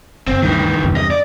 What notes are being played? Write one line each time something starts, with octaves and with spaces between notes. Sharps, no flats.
F#1 C4
D2 G2 D#3 E3
E2 G2 C3
D#5
D5